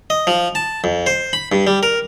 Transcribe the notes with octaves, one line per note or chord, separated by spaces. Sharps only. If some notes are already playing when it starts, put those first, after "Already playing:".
D#5
F3
A5
F2
C5
B5
G2
G3
A#4